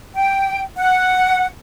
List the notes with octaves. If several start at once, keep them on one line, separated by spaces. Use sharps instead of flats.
G5
F#5